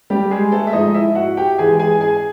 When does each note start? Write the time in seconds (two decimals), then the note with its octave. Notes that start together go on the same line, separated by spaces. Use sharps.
0.10 G3 G4
0.31 G#3 G#4
0.52 A3 A4
0.67 E5
0.73 G#2 F3 G#3 D#4 D#5
0.94 E4 E5
1.15 F#4 F#5
1.37 G4 G5
1.58 G#2 E3 G#3 G#4 G#5
1.79 G#4 G#5
2.00 G#4 G#5